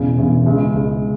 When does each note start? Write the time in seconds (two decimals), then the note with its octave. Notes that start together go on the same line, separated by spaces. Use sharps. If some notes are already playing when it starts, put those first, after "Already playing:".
Already playing: E1 E2 C#3
0.18 E1 E2 C#3
0.46 C#2 C#3 G#3
0.75 C#2 C#3 G#3